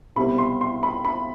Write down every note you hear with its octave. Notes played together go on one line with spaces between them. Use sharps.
C2 B2 G3 C4 B5
C6
C6
B5
B5